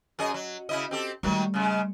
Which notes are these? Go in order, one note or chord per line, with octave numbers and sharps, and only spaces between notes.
F#2 G#4 D#5
F#3
C#3 E4 D#5
C4 G4 A4
D#3 F#3 G3 A3
C#3 G#3